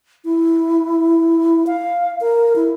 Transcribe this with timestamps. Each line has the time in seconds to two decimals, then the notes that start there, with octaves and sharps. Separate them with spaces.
0.25 E4
1.67 F5
2.20 A#4
2.55 E4